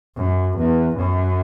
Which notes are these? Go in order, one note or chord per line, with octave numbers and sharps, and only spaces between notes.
F#2
E2
F#2